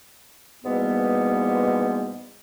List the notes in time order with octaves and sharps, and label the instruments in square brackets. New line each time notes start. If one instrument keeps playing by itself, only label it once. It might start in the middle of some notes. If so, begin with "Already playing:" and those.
[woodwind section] G#2 B2 E3 G3 A#3 B3